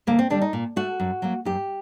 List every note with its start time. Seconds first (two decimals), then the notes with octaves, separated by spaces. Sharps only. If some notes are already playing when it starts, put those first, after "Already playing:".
0.07 D2 A#3
0.19 C4
0.30 D3 G3 D4
0.42 D#4
0.53 A#2
0.76 A3 F#4
1.00 F#2
1.22 F#3 A#3
1.45 F#2 G4